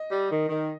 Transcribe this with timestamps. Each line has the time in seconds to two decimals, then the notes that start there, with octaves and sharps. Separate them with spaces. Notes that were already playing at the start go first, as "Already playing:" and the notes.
Already playing: D#5
0.11 G3
0.30 D#3
0.50 D#3